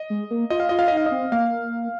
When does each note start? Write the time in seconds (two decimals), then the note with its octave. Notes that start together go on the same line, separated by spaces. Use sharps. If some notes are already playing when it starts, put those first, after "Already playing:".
Already playing: D#5
0.10 G#3
0.30 A#3
0.50 F4 D#5
0.60 F5
0.69 F4 D#5
0.79 F5
0.88 D#4 D#5
0.97 F5
1.06 D#5
1.11 C4
1.32 A#3 F5